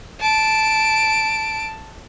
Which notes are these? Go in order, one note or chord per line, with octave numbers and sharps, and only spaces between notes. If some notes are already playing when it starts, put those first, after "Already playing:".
A5 D7